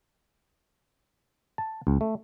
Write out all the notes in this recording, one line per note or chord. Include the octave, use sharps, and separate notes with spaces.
A5
C#2
A3